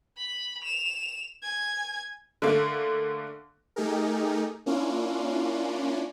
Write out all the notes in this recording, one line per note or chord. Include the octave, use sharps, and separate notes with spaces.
B5
E7 F7
G#5 G#6
D3 A3 A#3
A3 D#4 G4 G#4 A#4
A#3 C#4 D4 E4 F4